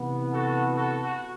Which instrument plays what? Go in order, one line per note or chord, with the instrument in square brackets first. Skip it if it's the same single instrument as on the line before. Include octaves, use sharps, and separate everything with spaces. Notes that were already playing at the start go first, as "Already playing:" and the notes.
Already playing: [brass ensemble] C3 E3 B3
[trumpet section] F#4 A4
F#4 A4
F#4